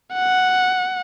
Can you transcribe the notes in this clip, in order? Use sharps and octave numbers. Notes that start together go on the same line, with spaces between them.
F#5